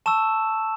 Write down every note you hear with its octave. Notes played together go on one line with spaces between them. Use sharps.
A5 C#6 E6 E7